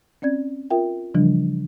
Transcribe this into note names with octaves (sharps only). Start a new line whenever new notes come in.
C4 C#4 D5 G#6
F4 A#4 E5 G5
C#3 E3 F3 G3 D4